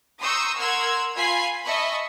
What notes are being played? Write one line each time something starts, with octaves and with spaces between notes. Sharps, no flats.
A#5 C6 C#6 D#6 E6 G6
A#4 F#5 C6 E6 F6 G#6
F4 F5 G#5 B5 G#6 C7
D#5 E5 A5 B5 C#6